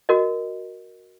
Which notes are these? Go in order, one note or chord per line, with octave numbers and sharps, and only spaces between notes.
F#4 A#4 D#5